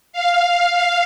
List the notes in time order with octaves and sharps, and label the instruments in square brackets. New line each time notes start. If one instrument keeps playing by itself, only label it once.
[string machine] F5